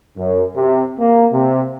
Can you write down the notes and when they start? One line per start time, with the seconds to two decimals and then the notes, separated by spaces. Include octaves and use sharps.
0.17 F#2
0.56 C3
0.99 A#3
1.33 C3